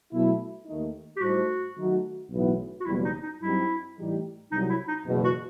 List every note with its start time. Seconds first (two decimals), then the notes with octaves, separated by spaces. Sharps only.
0.12 B2 F#3 A3 E4
0.66 D#2 D#3 A3 D#4
1.17 G4
1.21 A2 G3 D#4 F#4 A4 C5
1.76 D#3 F#3 A3 D#4 F#4
2.31 B1 A2 E3 B3 E4
2.81 F#4
2.86 F#1 E2 B2 G3 E4
3.05 D#4
3.23 D#4
3.41 G2 F#3 C4 D#4 E4 G4
3.97 A2 E3 G3 D#4 G4
4.51 C2 C3 F#3 D#4
4.70 E4
4.88 D#4
5.06 F#1 E2 B2
5.25 F#4